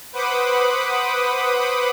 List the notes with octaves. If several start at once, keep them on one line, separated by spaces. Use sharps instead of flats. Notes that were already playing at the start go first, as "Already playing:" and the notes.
B4 C5 F#5 B5 D6 D#6